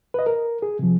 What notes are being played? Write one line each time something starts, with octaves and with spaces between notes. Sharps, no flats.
B4 D#5
A#4
G#4
C3 F3